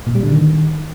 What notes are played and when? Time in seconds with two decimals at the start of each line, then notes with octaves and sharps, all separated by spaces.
0.07 A#2
0.15 G3
0.23 D3
0.32 D#3